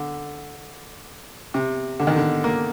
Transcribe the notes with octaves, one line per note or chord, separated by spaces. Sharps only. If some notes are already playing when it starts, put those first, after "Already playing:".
Already playing: D3
C3
D3
D#3
D3
A#3